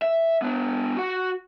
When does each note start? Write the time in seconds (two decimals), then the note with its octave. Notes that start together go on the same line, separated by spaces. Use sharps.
0.02 E5
0.42 B3 D4
0.97 F#4 F#5